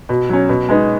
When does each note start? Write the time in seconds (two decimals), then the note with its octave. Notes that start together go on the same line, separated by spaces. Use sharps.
0.09 B2
0.29 F#3 C#4
0.49 B2
0.69 G#3 B3 D#4